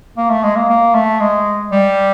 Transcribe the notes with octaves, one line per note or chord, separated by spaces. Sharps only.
A#3
A3
G#3
A#3
A#3
A3
G#3
G3